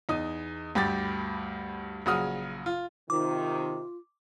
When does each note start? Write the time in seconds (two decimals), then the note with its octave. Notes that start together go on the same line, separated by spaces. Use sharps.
0.09 E2 D#4 D#6
0.75 D2 G2 G4 B5 D6 A6
2.06 A#1 C#3 F#3 F#4 D#6 F6
2.66 F4
3.10 C3 D#3 F4 D6